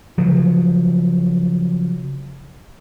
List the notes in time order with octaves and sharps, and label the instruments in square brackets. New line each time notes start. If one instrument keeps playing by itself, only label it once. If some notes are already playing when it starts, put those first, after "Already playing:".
[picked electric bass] C#3 F3 F#3